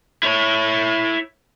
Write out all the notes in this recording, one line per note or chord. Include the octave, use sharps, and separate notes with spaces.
E4 C#5